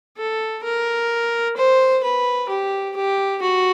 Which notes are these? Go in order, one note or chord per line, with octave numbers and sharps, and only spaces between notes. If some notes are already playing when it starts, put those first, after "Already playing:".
A4
A#4
C5
B4
G4
G4
F#4